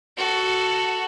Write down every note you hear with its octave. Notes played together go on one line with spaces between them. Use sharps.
F#4 A4